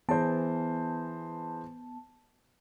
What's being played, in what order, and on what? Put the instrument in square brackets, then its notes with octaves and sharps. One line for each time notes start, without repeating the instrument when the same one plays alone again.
[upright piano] E3 G#4 C5 [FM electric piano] B3 A5